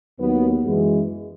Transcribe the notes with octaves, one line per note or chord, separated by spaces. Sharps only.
D#2 D#3 F#3 B3
F#2 E3 G#3